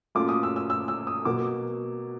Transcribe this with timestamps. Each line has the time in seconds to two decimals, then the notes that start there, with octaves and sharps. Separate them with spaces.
0.15 A#2 F#3 A3 C#4 F4 D6
0.29 D#6
0.43 E6
0.56 E6
0.70 E6
0.88 E6
1.07 D#6
1.25 B2 F#3 A#3 D6